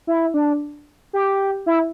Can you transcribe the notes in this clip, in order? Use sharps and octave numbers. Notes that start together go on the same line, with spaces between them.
E4
D4
G4
E4